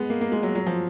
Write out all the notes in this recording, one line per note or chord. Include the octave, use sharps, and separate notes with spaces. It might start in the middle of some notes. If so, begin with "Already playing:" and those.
Already playing: G#3 B3
A#3
A#3
G#3
F#3
F#3
F3